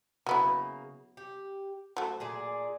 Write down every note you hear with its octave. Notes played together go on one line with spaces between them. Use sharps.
C#3 F#3 A#3 B3 E4
G4
F#3 A3 C5
A#2 G#4 D5